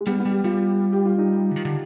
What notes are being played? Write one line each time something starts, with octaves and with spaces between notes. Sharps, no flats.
G#3
G3 B3
B3
G3
G4
G3 F4
G4
F4
D#4
D3
D#3
D3